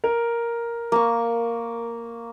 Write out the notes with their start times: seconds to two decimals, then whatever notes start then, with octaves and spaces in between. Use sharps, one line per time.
0.04 A#4
0.92 A#3 C#6